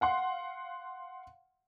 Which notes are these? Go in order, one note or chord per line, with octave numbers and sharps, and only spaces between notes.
F5 F#5 C6